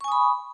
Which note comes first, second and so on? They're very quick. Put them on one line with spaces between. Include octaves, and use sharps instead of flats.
C#6 G#5 D#6 B5